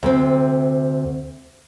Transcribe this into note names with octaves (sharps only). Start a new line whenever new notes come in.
D2 C3 C4